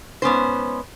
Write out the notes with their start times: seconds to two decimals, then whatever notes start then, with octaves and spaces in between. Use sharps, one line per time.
0.22 G#2 B3 C#4 C5